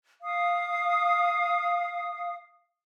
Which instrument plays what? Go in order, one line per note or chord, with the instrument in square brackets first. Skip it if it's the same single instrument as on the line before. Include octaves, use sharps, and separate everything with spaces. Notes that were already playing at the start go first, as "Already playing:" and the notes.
[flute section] F5 D#6